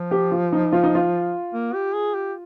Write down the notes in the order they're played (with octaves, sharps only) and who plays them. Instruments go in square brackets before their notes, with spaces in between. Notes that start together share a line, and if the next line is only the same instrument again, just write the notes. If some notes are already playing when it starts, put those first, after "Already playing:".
Already playing: [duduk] F3
[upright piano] G4
F4
D#4
F4
D#4
F4
[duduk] A#3
G4
G#4
G4